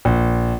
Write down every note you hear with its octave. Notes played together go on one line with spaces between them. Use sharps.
A#1